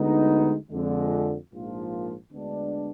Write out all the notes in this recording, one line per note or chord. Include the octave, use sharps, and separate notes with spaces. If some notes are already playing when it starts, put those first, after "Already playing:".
Already playing: D2 D3 G#3 B3 D#4
F2 D3 G#3
A#1 G#2 F3 A#3 F4
D2 D3 G#3 B3 D4